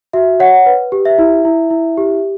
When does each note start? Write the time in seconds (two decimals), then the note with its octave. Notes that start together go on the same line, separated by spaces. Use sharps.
0.13 F#4 E5
0.40 C#5 F#5
0.66 B4
0.92 G4
1.05 E5
1.18 E4
1.45 E4
1.70 E4
1.97 G4